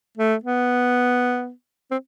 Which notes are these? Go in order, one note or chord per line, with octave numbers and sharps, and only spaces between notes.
A3
B3
C4